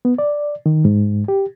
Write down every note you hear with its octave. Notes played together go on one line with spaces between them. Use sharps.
B3
D5
D#3
G#2
G4